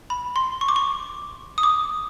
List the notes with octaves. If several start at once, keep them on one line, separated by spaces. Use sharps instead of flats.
B5
C6
C#6
D6
C#6
D#6
D6